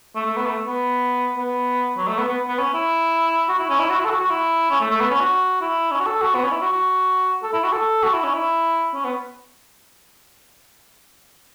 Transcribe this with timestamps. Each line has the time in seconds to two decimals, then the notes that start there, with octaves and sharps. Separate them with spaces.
0.16 A3
0.26 A3
0.36 B3
0.46 A3
0.66 B3
1.37 B3
1.97 F#3
2.08 A3
2.18 B3
2.28 B3
2.48 B3
2.59 C#4
2.74 E4
3.49 F#4
3.59 E4
3.69 C#4
3.79 E4
3.89 F#4
3.99 E4
4.05 A4
4.10 F#4
4.20 F#4
4.30 E4
4.70 C#4
4.80 A3
4.90 A3
5.00 B3
5.11 C#4
5.21 F#4
5.61 E4
5.91 C#4
6.00 F#4
6.06 A4
6.22 F#4
6.35 B3
6.44 C#4
6.52 E4
6.62 F#4
6.72 F#4
7.43 A4
7.53 E4
7.64 F#4
7.73 A4
8.03 F#4
8.13 E4
8.24 C#4
8.34 E4
8.94 C#4
9.05 B3